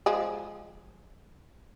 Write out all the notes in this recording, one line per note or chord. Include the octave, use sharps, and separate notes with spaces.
F3 G#3 G#4